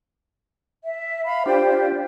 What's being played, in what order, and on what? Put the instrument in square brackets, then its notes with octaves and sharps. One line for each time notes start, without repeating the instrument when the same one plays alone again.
[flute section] E5
F5 B5
[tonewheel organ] D4 F4 G4 [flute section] C5 G5